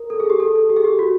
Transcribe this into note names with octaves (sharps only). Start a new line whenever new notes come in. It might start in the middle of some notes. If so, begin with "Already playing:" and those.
Already playing: A#4
A4
G#4
G4
A4
A4
G4
G#4
G4
F#4